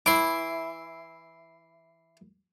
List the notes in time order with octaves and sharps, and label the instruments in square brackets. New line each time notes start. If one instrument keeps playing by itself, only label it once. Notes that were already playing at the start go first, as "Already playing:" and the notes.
[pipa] E3 E4 [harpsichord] C6 D6